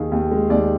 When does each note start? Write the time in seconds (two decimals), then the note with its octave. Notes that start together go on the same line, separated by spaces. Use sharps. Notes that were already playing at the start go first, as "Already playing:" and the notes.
Already playing: D#2 D#3 G#4
0.12 D#2
0.31 G#3
0.50 D#2 D5